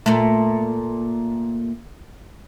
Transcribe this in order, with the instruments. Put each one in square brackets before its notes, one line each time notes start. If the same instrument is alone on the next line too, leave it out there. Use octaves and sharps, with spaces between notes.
[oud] A#2 A3